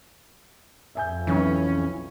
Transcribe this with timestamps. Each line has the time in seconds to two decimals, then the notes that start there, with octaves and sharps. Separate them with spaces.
0.95 F2 E5 G#5 G6
1.27 B1 E3 C#4